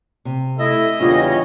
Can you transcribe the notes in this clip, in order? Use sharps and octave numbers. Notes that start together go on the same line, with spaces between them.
C3
A3 E4 D#5 E5
E2 C#3 G3 C#4 D4 F4